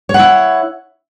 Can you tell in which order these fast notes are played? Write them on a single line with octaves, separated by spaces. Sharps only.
C#5 F#5 E4